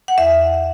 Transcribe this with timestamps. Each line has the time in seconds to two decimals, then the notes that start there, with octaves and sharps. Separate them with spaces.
0.08 F#5
0.18 E2 E5